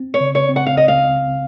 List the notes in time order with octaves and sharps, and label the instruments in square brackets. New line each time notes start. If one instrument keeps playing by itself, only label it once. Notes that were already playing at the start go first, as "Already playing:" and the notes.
Already playing: [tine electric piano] C4
[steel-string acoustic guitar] C#5
[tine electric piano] C#3
[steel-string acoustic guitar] C#5
[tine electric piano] C4
[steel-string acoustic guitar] F#5
F5
[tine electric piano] C#2 [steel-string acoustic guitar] D#5
[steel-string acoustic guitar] F5